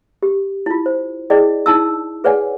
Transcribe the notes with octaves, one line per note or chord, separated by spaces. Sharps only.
G4
E4 F4
C5
E4 G#4 D5 D#5 G5
D#4 E4 A5 E6
G#4 B4 C#5 D5 F#5 G#5